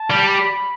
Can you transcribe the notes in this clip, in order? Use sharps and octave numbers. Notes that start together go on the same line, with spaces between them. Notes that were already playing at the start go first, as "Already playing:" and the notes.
Already playing: A5
G3
B5